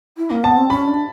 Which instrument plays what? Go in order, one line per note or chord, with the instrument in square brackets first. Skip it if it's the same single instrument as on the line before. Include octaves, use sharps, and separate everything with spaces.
[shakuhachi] E4
A#3
[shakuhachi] B3 [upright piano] A5
[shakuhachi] C4
[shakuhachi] C#4 [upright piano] B5
[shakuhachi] D4